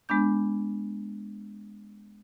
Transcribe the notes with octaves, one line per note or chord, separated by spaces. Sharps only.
G#3 B3 D4 G6